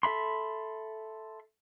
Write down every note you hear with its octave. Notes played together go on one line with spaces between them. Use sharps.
A4 E5 B5 C6